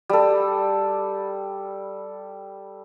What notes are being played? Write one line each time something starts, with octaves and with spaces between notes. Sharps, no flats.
G3 A4